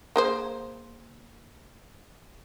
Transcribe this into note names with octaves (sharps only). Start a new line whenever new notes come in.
A#3 G#4 C5